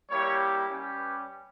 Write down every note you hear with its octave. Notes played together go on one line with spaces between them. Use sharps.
G3 A#3 E4 G4 C#5
G3 C#4 G4
B4